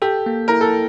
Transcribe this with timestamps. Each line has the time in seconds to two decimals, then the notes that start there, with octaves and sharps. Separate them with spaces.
0.02 G4 A4
0.26 A#3
0.48 E4 A#4
0.61 A4